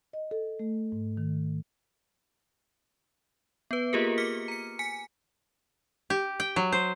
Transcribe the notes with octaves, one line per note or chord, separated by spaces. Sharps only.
D#5
A4
A3
G#2
D#3
B3 B4
A#3 F4 G4 G#4 A#4
D6 F6 B6 C#7
A#5 C#7
G#5 B6 C#7
G4
G5
F#3
C5